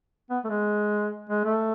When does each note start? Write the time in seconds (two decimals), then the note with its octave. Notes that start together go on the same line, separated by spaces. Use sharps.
0.30 B3
0.44 A3
0.50 G#3
1.30 G#3
1.44 A3